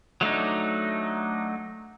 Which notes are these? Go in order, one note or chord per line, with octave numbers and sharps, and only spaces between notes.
F#3 A3 D4 D#4